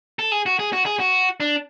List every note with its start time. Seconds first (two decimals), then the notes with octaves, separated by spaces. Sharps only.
0.19 A4
0.32 G#4
0.46 F#4
0.59 G#4
0.73 F#4
0.86 G#4
1.00 F#4
1.40 D4